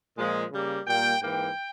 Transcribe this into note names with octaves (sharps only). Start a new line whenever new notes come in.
A#2 F3 G#3
C#3 G3 A#3
A#2 G3 A#3 G5
G#2 E3 A#3 G5